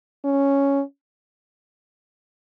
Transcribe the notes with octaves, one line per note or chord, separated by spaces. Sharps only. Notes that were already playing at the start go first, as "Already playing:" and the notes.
C#4